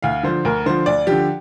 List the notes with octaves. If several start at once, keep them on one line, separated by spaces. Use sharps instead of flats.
D2 F5
D3 F3 C5
D2 A#4
D3 F3 C5
D2 D5
D3 F3 G4